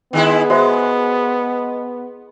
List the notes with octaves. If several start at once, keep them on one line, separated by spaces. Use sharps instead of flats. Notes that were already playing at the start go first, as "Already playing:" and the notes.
D#3 G#3 B3 E4
G#3 F#4 C5 E5